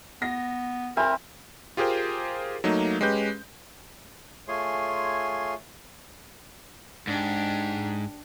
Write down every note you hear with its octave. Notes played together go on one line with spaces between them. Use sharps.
B3 A#6
C4 A#4 E5 G#5 B5
F4 G4 G#4 A#4 C5 G5
F#3 A3 A#3 D#4
G#3 C#4 G4 B4 G6
A3 F4 G#4 C#5 G#5 C6
G#2 D4 G4